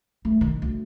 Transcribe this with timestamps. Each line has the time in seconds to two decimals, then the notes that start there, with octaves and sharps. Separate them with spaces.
0.25 A3
0.41 D#3
0.62 D2